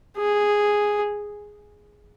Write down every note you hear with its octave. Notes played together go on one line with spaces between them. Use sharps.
G#4